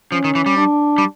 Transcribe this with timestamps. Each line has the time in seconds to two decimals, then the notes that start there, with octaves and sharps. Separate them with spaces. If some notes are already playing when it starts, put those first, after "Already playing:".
0.12 F3 C#4
0.24 D#3
0.35 E3
0.46 G3
0.57 D4
0.98 G3